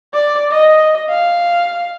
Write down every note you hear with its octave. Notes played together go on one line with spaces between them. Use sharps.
D5
D#5
F5